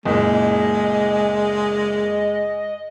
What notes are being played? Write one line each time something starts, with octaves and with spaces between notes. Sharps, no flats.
F#1 A#2 G#3 D#5